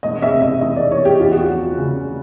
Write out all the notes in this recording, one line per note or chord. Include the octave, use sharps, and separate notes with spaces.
E1 D#5
E5
C3
D#5
E2 D#5
D5
E3 C#5
G4
E2 F4
F#4
F4
F3
C#3